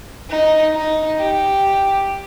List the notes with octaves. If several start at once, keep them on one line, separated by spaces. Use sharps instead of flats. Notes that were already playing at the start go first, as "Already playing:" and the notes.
D#4
D#4
G4